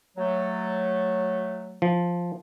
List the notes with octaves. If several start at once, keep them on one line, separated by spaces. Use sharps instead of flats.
F#3 A3
F3